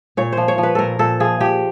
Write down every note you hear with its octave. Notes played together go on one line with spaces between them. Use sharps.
A#2 C#5
F3 C5
C#5
F3
B4
A#2 A4 A#4
A#2 A4
F3 G#4
F3 G4